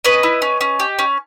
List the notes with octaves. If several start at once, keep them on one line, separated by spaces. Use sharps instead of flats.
C#4 B4 D#5
E4
C#4
C#4
G4
C#4